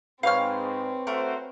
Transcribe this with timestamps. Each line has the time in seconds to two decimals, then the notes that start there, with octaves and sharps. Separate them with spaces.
0.23 G#2 C4 B4 C#5 F5 F6
1.07 A3 F#4 A#4 C5